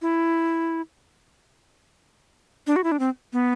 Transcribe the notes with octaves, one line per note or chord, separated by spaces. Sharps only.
E4
D4
F#4
E4
D4
C4
B3